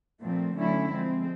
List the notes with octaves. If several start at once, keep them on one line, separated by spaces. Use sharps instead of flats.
A#2 F3 A3 C4
D3 F#3 A3 C#4 E4
F3 G#3 C4